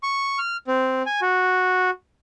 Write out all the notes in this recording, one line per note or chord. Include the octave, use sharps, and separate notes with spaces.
C#6
F6
C4
G#5
F#4